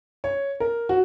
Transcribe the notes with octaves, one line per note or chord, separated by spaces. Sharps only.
C#5
A#4
F#4